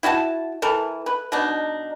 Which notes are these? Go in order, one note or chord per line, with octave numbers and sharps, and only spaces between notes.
E4 F#4 G5 A5
E3 A4 A#4
B4
B2 D4 D#4